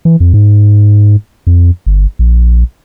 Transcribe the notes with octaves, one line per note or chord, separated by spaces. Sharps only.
E3
F2
G#2
F2
G1
A#1